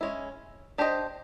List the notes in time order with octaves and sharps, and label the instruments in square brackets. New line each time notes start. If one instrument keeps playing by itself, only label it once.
[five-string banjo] G#3 C#4 E4
D4 G4 C5 D#5